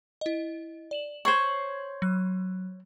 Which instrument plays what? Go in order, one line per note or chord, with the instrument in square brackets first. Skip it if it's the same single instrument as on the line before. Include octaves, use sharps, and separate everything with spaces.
[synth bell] E4 D#5
D5 E7 F#7
[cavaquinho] C5 C#5 [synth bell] G#6 C7 F#7
[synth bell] F#3 F#6